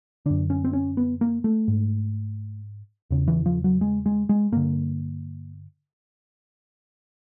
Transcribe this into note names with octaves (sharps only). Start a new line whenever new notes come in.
F#2 D3 D4
C#4
C4
C#4
B3
A#3
A3
G#2
E2 C#3
E3
F3
F#3
G#3
G#3
G#3
G2 D3 A#3